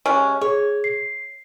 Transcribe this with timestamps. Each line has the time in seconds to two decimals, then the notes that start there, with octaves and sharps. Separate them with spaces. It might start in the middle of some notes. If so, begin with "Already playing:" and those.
0.06 C3 G#3 C#4
0.41 G#4 C#5
0.84 C7